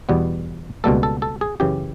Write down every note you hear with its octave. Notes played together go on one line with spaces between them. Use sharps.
E2 B2 G3 B3
C#2 B2 G3 A#3 A4
A4
A4
G#4
F#2 C#3 E3 G4